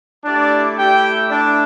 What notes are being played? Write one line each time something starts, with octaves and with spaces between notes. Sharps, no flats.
A3 D4 E4 G4 D5
G4 G5
D4 D5